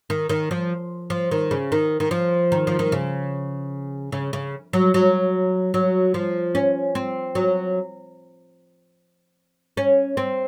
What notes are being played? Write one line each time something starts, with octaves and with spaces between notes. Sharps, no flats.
D#3
D#3
F3
F3
D#3
C#3
D#3
D#3
F3
D#3
F3
D#3
C#3
C#3
C#3
F#3
F#3
F#3
F3
C#4
C4
F#3
C#4
C4